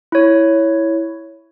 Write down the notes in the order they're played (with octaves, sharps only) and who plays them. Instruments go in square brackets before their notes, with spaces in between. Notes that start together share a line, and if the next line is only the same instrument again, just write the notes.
[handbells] E4 C#5